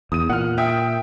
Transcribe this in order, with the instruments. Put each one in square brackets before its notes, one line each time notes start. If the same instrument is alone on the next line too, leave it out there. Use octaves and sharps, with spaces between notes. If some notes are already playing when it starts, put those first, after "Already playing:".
[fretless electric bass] E2 [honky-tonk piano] D#6 D#7
[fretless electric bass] A#2 [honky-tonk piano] F#5 F6
[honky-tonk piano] E5 G5 D#6